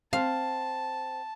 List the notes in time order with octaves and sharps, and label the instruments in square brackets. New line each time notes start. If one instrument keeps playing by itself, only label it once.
[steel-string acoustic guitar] C4 [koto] F5 [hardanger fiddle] A5